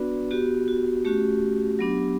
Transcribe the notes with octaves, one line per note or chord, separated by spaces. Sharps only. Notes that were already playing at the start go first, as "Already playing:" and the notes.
Already playing: B3 D4 F#4 B4 D5
B3 F#4 G4
F#4
A3 C#4 F#4 G4
F#3 B3 D4